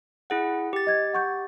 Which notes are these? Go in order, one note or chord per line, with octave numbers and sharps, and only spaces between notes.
E4 G#4 F#5
G4 A6
D#5 G#6
F#5 C#6 G6